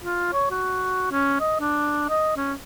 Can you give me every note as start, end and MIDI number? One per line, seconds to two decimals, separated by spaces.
0.04 0.29 65
0.33 0.47 73
0.51 1.12 66
1.12 1.37 61
1.40 1.58 75
1.60 2.09 62
2.09 2.36 75
2.37 2.53 61